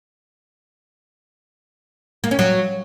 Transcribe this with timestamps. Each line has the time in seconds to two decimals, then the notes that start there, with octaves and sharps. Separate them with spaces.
2.24 A#3
2.31 C#4
2.39 F#3